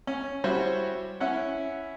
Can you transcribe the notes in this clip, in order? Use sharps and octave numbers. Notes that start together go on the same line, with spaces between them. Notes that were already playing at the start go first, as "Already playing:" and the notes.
C#4
G3 E4 F#4 C5 C#5
C#4 E4 E5 F#5